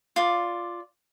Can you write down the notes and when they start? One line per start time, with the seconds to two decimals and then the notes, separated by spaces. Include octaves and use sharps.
0.16 F4 D5